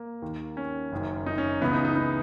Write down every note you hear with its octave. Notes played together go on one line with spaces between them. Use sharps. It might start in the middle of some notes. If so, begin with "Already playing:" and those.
Already playing: A#3
D#2 D#3
C#4
F#1 F#2 D#3
D#4
C#4
C#2 C#3 E3 B3
D#4
D#4
D#4